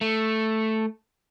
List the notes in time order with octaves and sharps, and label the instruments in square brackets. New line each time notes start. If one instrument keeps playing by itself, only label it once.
[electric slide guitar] A3